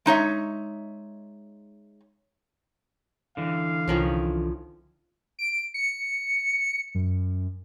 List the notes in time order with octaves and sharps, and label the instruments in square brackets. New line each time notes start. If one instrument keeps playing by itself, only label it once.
[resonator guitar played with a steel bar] G#3 D#4 C#5 E5
[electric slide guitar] D3 E3 [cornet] F5
[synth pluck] C2 [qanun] D#3 F3 C#4
[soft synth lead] D7
C#7
F#2